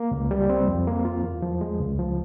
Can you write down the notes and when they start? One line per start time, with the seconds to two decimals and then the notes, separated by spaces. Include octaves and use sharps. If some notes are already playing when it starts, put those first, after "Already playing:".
Already playing: A#3
0.11 C#2
0.31 G3
0.50 C4
0.68 F2
0.87 A#3
1.05 F4
1.23 E2
1.42 F3
1.61 G#3
1.80 C#2
1.99 F3